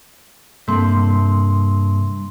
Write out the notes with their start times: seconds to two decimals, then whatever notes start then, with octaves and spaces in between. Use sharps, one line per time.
0.68 G2 C3 A#3 A4 C6